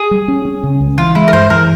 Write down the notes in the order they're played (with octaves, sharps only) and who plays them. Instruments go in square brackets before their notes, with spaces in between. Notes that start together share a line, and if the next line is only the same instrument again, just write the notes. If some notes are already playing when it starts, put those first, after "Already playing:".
Already playing: [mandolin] G#4
[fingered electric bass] G3
C#4
C#4
C#3
C#2
[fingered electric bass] E3 [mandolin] F4
[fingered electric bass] G#3 [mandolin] E4
[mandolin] A#4
[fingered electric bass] G2 [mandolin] C5
[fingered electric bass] E3 [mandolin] A#4